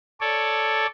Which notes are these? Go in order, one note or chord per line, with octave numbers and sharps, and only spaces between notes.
A4 C#5 D5